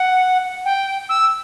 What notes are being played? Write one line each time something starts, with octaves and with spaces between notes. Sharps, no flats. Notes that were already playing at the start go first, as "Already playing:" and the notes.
Already playing: F#5
G5
E6